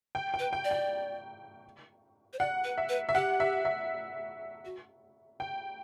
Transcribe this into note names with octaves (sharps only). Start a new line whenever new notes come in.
G5
G5
B4
G5
D5
G5
C5
D5 F#5
B4
E5
B4
E5
G4 F#5
E5
E5
F#4
G5